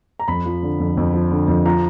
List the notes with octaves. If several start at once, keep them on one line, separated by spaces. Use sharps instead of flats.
A#5
F2 B5
F3
D3
F2
F2
F3
D3
F2
F3 A#5